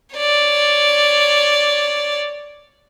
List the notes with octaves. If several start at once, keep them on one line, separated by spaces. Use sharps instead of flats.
C#5 D5